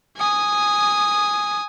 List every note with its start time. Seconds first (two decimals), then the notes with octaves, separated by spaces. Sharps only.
0.17 G#5 D#6